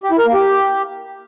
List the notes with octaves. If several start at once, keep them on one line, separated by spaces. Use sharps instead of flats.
G4
E4
A#4
A#3
G4